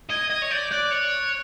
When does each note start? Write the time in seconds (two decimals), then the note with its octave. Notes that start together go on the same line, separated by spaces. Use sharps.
0.10 D#5 G#6
0.30 D#5 G#6
0.42 C#5
0.51 D5 G6
0.71 D5 F#6
0.91 C#5